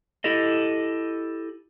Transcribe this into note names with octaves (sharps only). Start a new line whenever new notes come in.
E4 G4 A4 D#5